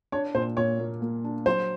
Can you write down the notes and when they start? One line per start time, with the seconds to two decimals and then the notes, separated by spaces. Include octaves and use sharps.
0.12 D4 C#5
0.35 A#2 C5
0.57 A#2 C#5
0.79 A#3
1.02 A#3
1.24 D4
1.46 F#3 C5